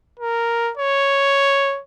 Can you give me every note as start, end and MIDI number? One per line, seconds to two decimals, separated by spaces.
0.19 0.72 70
0.77 1.80 73